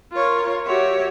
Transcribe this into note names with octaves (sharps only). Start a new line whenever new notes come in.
F4 A#4 C#5
F#4 G4 C#5 E5